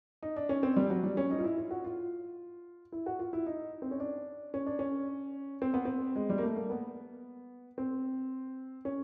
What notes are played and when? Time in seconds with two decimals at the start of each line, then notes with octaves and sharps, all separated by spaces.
0.23 D#4
0.36 D4
0.49 C#4
0.63 C4
0.76 G3
0.90 F#3
1.03 G3
1.17 C#4
1.31 D#4
1.39 F4
1.44 E4
1.58 F4
1.71 F#4
1.84 F4
2.92 E4
3.06 F#4
3.19 F4
3.33 E4
3.46 D#4
3.82 C4
3.91 C#4
4.00 D4
4.54 C#4
4.66 D4
4.79 C#4
5.62 C4
5.74 B3
5.85 C4
6.16 G#3
6.30 G3
6.38 A#3
6.43 A3
6.56 A#3
6.70 B3
7.78 C4
8.85 C#4